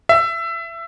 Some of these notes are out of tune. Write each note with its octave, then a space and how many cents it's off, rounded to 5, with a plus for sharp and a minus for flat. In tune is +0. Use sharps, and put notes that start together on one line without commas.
E5 +20